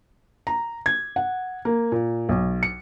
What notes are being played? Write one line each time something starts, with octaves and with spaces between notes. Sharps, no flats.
A#5
G#6
F#5
A#3
A#2
B1
C#7